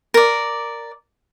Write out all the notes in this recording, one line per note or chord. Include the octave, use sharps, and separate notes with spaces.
A#4 D5